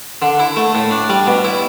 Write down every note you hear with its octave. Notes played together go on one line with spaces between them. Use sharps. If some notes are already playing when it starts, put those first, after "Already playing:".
D3
E4
A3
A2
D4
G3
B2
E4